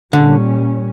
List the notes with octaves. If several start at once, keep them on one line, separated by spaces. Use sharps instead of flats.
A#2 D3 G3 C#4